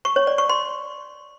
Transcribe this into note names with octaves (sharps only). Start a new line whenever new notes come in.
C#6
C#5
D5
C#6
C6